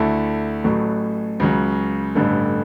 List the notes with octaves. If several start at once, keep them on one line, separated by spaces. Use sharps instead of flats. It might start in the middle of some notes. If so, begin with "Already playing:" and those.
Already playing: D2 D3 A3 E4 A4
A1 A2 F#3 A3
C#2 C#3 F#3
A1 G2 D3 A3